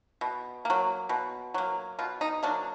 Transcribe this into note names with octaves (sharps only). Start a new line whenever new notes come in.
B2
F#3 A#3
B2
F#3 A#3
B2 F4
D#4
F#3 A#3 D4